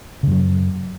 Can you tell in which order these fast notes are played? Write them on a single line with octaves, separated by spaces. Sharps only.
C#3 F#2 F#3